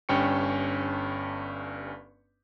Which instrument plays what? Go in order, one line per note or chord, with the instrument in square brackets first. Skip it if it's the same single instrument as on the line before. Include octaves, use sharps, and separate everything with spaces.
[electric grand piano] G1 G2 C#4 G5 C#6 C#7